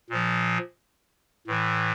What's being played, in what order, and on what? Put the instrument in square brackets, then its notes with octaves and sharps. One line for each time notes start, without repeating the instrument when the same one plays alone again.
[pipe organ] A#2 F3
A2 E3